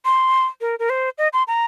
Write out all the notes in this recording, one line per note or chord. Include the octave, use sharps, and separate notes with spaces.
C6
A#4
A#4
C5
D#5
C6
A#5